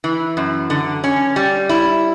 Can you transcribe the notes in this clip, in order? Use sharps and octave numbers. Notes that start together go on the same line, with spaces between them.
E3
F#2
D3
C#4
G3
E4